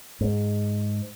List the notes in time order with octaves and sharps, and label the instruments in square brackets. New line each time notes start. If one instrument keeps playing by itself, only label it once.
[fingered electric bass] G#2